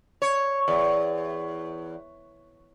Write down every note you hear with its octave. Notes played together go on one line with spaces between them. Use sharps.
C#5
E2